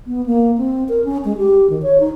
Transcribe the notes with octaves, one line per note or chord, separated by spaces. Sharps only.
B3
A#3
C4
A#4
C#4
G#3
G4
D#3
C#5
D#4